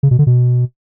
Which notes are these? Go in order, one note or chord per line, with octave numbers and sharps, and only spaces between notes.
C#3
B2
D3
B2